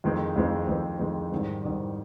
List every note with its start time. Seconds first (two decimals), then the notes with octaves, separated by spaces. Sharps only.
0.04 F2 D#3 G#3 C4
0.36 F2 D#3 G#3 C4
0.67 F2 D#3 G#3 C4
0.99 F2 D#3 G#3 C4
1.32 G#2 D#3 G3
1.64 G#2 D#3 G3